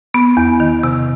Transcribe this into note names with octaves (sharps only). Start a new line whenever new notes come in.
B3
E2
D#3
C3